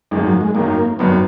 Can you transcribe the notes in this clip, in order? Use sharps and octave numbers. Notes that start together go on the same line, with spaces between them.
G#1 F#2 D#3 G#3 A#3
F#3
G#3
G#1 F#2 D#3 F#3 A#3
G#1 F#2 D#3 F#3 B3